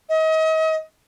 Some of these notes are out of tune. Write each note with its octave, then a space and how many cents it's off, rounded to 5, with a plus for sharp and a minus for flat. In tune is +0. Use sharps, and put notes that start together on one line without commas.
D#5 +35